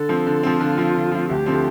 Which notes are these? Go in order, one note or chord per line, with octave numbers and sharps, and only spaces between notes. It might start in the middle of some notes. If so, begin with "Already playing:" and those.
Already playing: D3 A4
F3 C4
D3
F3 C4
D3 F4
F3 C4
D3
F3 C4
D2 G4
D3 F3 C4